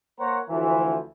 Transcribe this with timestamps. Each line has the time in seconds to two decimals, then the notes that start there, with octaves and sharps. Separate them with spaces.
0.19 A#3 A#4 C5 C#5 F#5 A#5
0.50 D2 E3 F3